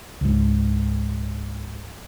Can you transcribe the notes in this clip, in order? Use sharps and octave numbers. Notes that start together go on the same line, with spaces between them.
C#2 G#2